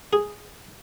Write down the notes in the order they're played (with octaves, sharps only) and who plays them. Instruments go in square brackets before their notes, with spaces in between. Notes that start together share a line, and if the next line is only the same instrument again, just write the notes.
[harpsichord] G#4